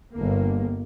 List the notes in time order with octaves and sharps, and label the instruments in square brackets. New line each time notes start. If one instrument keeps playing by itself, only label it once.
[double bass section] G1 A#3